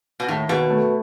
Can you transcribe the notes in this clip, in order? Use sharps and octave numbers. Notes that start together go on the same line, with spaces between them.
B2
D#2 A2
D#2 B2
A3